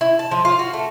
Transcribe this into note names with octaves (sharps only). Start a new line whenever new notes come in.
E4
A5
F3
F4
F#4
A3